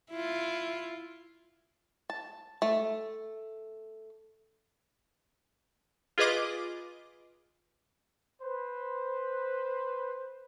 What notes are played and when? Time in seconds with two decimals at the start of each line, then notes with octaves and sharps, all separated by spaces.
0.12 E4 F4
2.10 A5
2.62 A3
6.18 F4 G#4 B4 D#5 D6
8.42 B4 C5